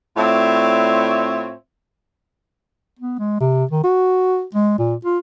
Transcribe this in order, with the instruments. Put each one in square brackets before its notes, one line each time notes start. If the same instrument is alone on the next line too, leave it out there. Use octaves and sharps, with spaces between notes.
[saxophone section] A2 C4 F4 C#5 D5 E5
[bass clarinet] B3
G#3
C3
D#3
F#4
G#3
A#2
F4